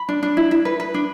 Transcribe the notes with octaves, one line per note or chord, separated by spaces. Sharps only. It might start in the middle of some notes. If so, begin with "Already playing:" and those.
Already playing: B5
D4
D4
E4
E4
B4
B4
D4